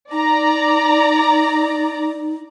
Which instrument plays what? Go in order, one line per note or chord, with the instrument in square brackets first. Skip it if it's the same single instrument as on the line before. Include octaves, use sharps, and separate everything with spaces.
[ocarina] D#4 [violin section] D5 A#5